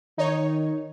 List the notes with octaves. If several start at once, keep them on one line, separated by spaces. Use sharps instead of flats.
D#3 D#4 C#5